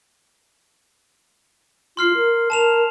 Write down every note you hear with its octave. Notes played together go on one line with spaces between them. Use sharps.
F4 C6 F6 C7
A#4
A#4 A5 E7 F7